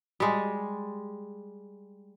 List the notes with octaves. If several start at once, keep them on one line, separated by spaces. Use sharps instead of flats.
G3 G#3